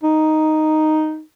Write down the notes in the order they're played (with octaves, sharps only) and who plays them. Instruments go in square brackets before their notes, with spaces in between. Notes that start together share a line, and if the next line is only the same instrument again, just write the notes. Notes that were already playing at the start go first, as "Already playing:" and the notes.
[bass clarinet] D#4